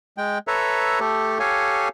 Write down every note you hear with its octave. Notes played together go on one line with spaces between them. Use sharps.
G#3 G5
A4 B4 C#5 E5 A#5
A3 G4 A4
G4 A4 C#5 F5 G#5